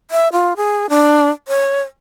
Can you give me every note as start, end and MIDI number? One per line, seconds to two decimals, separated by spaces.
0.11 0.28 76
0.32 0.53 65
0.57 0.86 68
0.89 1.29 62
1.48 1.82 73